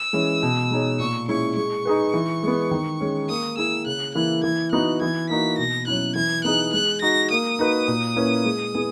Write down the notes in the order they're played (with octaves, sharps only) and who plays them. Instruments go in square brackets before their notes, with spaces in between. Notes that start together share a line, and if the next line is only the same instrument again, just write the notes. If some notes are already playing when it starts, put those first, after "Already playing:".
Already playing: [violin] E6
[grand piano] E3 G#3 C#4
B2
G#3 D#4 G#4 C#5
[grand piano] A#2 [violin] C#6
[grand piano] G#3 C#4 E4 [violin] C#6
[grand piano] G#3 [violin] C#6
[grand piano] D#4 G#4 B4
E3
G#3 B3
D#3
G#3 C#4
[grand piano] A#3 [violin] D#6
[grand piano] E4 G#4 [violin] E6
[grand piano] C#3 [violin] F#6
[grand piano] E3 A#3 E4 [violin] F#6
[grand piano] E3 [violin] G#6
[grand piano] B3 D#4 F#4 [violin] F#6
[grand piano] E3 [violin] G#6
[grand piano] A#3 D#4 F#4 [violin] B6
[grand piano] B2 [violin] A#6
[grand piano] F#3 C#4 E4 [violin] F#6
[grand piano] E3 [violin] G#6
[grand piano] B3 D#4 G#4 [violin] F#6
[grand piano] G#3 [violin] F#6
[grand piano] D#4 F#4 [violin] A#6
[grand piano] A#3 [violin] D#6
[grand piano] D#4 F#4 B4
A#2
A#3 C#4 E4 B4
G#3
B3 E4 G#4